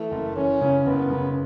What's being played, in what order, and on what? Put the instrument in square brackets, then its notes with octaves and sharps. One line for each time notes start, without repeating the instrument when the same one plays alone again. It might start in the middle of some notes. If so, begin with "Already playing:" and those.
Already playing: [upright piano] E3 [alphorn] A3
[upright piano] F#1
[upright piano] E3 [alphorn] C#4
[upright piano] C#3
[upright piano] F#1 [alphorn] B3
[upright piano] C#3